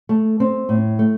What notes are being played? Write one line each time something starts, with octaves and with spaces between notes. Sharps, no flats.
A3
C4
A2
A3